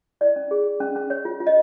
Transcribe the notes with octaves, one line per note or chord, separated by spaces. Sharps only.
E4 D5
C#4
G#4
G#4
C#4
C#4
C#5
F4
F4
D#5